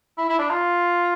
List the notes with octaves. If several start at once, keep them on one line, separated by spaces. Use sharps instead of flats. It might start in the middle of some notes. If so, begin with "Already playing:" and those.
E4
E4
D4
F4